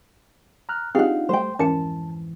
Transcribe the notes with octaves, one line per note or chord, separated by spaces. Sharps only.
A#5 F6 F#6
C4 D4 D#4 F4 G4 G#4 F5 F#5
G3 A3 C5 G5
F2 G#2 E3 C#4 A#4 A5 C#7